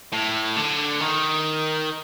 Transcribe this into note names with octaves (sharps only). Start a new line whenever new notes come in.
A2
D3
D#3